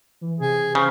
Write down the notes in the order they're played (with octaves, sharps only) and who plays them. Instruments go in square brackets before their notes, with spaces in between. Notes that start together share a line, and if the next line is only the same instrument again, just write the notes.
[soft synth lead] E3
[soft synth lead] C3 [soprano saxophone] G#4
[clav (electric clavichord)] C#3 [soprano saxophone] C5